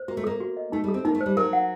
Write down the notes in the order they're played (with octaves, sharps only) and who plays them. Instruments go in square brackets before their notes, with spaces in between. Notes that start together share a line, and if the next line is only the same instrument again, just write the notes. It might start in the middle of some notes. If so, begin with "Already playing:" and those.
Already playing: [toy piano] C5
[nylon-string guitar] A#3 [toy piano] F#4
[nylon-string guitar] A3
[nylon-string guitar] A#3 [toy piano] A4
[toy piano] F#4
D#5
[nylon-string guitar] A3 [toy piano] D#4
[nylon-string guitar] G3
[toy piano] A4
[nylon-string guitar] C4
[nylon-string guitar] A#3 [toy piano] D#4
[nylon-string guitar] A3
[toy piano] C5
[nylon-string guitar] G3
[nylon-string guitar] F#3 [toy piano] A#4
[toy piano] F#5